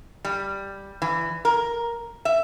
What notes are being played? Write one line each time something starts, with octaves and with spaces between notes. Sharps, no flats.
G3
E3
A#4
E5